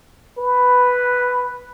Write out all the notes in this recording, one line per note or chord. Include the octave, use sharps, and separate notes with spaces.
B4